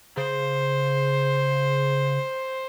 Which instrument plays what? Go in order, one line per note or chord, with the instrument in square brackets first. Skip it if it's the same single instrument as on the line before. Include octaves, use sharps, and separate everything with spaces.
[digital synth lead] C#3 [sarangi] C5